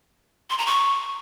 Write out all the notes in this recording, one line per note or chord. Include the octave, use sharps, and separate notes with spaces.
C6
A#5
C#6